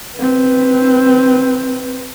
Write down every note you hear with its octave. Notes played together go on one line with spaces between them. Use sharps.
C4 B4